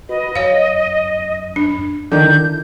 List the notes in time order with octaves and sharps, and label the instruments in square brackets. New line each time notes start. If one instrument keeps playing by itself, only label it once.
[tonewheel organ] F#4 B4 B5 [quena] D#5
[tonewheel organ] F#2 [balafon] C#5 F5
[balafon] D4
[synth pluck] D3 D#3 [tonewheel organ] E4 [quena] G6